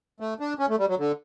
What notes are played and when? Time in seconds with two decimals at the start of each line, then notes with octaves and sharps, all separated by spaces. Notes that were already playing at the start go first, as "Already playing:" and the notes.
0.20 A3
0.40 D4
0.59 C#4
0.69 A3
0.79 G3
0.88 F#3
0.98 D3